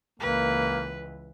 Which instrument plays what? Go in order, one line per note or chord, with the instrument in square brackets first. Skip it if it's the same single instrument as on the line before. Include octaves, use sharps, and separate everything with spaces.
[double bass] C#2 E3 [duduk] A#3 [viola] B4